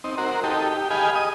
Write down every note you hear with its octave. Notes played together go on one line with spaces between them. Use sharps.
C4 D#4
F#4 A#4 C5
D#4 G4 A4
G4
G4 G#4 D#5 F5 G#5 B5
D#5 D#6